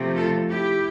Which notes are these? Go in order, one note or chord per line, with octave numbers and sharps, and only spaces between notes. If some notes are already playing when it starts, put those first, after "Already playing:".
Already playing: C3 F3 A3 C4
F4 A4
E4 G4